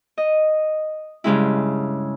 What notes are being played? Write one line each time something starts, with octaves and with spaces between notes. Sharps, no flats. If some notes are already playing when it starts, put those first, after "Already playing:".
D#5
G2 C#3 G#3 E4